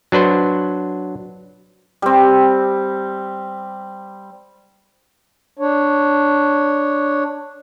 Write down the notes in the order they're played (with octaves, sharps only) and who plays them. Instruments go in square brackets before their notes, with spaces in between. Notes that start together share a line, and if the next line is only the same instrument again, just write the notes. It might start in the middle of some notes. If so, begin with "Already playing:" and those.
[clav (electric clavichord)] F#3 D4 B4 C5
[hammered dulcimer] G3 C4
[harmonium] D4 C#5